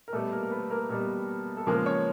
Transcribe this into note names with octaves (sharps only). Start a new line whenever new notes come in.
A#4
B2 G3 A3 B3 A4
A#3 A#4
A#4
B3 B4
A#3 A#4
B2 G3 A#3 B3 A#4
A4
C#3 F3 G#3 A#3 B3 A#4
C#4 C#5